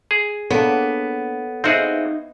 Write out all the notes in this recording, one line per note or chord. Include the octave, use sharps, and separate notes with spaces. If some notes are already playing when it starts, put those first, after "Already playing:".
G#4
A#3 B3 D4 A4 C#5 D#7
C4 D#4 E4 F#4 G#4 F5